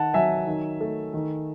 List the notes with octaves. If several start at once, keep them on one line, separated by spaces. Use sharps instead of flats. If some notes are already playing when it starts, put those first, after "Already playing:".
Already playing: D#3 F#5 A5
F#3 E5 G#5
D#3
A3
D#3